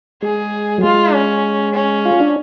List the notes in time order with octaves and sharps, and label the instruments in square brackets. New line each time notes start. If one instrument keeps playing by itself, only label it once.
[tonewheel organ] G#3 [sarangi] G#4
[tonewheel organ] F#3
[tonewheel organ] G#3 [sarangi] F4
[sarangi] C#4
C#4
[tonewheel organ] F4
D4